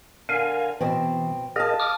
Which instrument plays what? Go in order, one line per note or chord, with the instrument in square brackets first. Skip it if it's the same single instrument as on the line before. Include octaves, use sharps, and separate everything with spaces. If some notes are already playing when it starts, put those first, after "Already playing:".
[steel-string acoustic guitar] D3 [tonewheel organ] A#4 F5 G#5
[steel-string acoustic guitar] B2 C4 [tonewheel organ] E3
[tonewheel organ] G#4 A#4 D#5 [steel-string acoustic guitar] F5 A5
[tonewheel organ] D6 D#6 F6